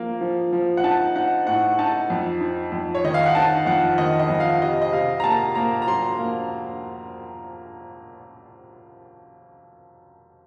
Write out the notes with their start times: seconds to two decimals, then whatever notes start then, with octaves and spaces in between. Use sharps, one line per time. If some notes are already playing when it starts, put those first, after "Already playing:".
Already playing: F3 A#3
0.21 F3
0.53 F3
0.77 F#5
0.83 D#4 A5
1.16 D#4 F#5
1.47 A2 F#5
1.79 D#4 A5
2.10 F2
2.41 D#4
2.72 F2
2.95 C#5
3.04 D#3 D#5
3.14 F5
3.26 F#5
3.35 D#4 A5
3.66 F2 F#5
3.98 D#3 D#5
4.19 D#5
4.29 F2
4.40 F5
4.62 C3 D#5
4.82 D#5
4.93 C3 F5
5.20 A#5
5.24 A#3 A5
5.55 A#3 A#5
5.82 A#5
5.87 F#3 C6
6.19 A#3